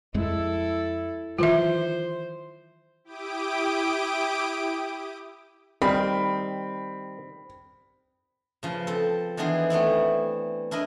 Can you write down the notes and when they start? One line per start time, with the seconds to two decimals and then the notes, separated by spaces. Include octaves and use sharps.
0.14 F2 G#3 E4 A4
1.39 D#3 E3 F#3 F4 C5 E5
3.04 E4 G4 G5 D6 D#6 D7
5.82 D#3 G3 C4 B5
8.63 C#3 F3 B4
8.87 C4 A4
9.37 D#3 E3 B3 D4 G#4 C5
9.70 A3 B3 C4 E4
10.71 D4 E4 A#4 D#5